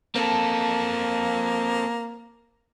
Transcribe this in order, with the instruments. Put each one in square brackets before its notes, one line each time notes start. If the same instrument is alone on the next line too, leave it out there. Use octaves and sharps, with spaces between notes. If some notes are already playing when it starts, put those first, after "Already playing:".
[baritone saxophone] A#3 [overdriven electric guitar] C4 A4